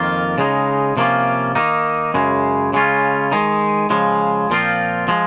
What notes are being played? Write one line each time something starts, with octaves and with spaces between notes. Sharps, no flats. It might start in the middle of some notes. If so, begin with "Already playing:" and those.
Already playing: F2 D#3 A#3 F4
C#3 G#3 D#4
C3 F3 A#3 C#4 F4
D#3 A#3 D#4
F#2 C#3 G#3
C#3 G#3 C#4 F4
D#3 G#3 D#4
C#3 F3 G#3
A#2 F3 C4 F4
F3 G#3